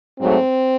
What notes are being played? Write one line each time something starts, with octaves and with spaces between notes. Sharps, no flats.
G#2 F#3 A3 C4